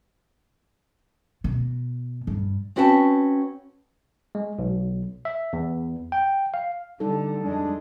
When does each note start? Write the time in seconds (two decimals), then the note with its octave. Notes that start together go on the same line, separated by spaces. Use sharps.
1.44 B2
2.27 G2
2.76 C4 C#4 F#4 B4 G5 A5
4.35 G#3
4.59 B1
5.25 E5
5.53 E2
6.12 G5
6.54 F5
7.00 D3 G3 D#4 A4
7.43 F2 G#3 D4